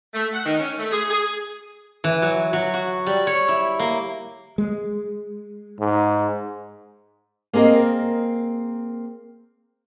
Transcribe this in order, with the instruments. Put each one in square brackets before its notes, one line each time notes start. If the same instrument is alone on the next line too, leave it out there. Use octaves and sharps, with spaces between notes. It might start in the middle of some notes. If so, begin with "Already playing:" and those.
[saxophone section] A3
F#5
D#3
C#4
A3
G#4
G#4
[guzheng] E3
F#3
F#3
F#4
G3
C#5
E4
A#3
[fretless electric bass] G#3
[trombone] G#2
[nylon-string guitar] A#3 C4 G#4 A#4 D#5